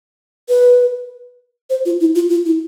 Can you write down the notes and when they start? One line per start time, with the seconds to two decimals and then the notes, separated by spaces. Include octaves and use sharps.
0.49 B4
1.70 C5
1.86 F4
2.00 E4
2.15 F4
2.30 F4
2.46 E4